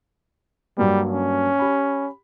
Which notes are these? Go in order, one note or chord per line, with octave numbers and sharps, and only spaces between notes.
G2 F#3 G3 A#3
C#4
G4 B5